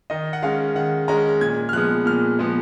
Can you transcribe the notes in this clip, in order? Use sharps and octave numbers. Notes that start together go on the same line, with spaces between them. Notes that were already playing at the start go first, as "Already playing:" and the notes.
D#3 D#5
F#5
G#3 C#4 F5
D#3 F#5
G#3 C#4 A#5
A#2 G#6
F6
F3 G#3 B3 F#6
A#2 F6
F3 G#3 B3